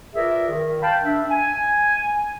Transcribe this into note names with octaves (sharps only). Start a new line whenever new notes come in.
F4 G#4 A#4 B4 D5 E5
D#3
F5 G5 A5 B5
D4 E5
G#5